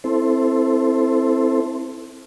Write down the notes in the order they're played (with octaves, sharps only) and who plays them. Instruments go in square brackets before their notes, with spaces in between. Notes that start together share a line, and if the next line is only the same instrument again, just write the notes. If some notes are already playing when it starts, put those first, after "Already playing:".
[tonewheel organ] C4 E4 A4 C5